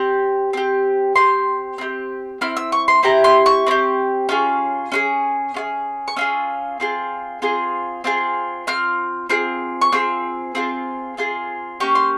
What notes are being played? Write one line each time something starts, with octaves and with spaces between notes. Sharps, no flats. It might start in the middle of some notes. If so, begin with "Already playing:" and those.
Already playing: C4 G4
C4 G4
C4 G4 C6
C4 E4 G4
C4 E4 F6
E6
C#6
C6
C4 E4 G4 A#5
C6
C#6
C4 E4 G4
C#4 F4 G#4
C#4 F4 G#4
C#4 F4 G#4
C#6
C#4 F4 G#4 E6
C4 F4 G#4
C4 F4 G#4
C4 F4 G#4
C4 F4 F6
C4 F4 G#4
C#6
C4 F4 G#4 E6
C4 F4 G#4
C4 F4 G#4
A#3 C#4 G4 C#6
C6